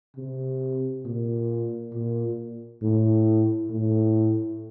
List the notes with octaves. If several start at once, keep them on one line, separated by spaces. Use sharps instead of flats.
C3
A#2
A#2
A2
A2